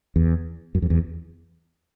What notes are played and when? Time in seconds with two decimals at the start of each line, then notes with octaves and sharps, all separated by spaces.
0.16 E2
0.75 F#2
0.82 F2
0.90 E2